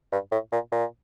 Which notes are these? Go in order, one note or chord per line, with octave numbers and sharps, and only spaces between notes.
G2
A2
A#2
A#2